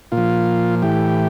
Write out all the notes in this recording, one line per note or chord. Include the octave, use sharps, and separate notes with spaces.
A#2 F4
F3
A2 E3 G4